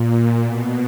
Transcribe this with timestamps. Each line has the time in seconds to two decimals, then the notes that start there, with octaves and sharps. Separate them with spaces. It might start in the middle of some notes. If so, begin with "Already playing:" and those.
Already playing: A#2
0.44 B2